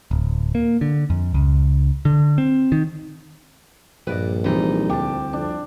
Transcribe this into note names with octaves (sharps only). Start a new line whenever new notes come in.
D1
A#3
D3
F2
C#2
D3
C4
D#3
A#1 G2 B4 D5 D#5
C2 E3 G3 D#4
D2 G4 A5
F2 D4